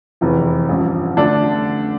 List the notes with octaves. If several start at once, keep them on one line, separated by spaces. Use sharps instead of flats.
F1 E2 E3
A1 G2 F3
D3 A3 D4